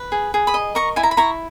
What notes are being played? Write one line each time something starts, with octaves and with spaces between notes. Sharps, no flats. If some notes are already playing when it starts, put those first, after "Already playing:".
Already playing: B4
G#4
G#4
B5 D#6
D#5
A#4 A#5 C#6
E4 G#5
A#5
B5
E4 A#5 C#6